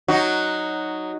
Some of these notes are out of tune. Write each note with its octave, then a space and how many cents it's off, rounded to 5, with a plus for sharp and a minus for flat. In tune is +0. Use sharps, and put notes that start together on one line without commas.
F#3 +0 D#4 +0 F#4 +0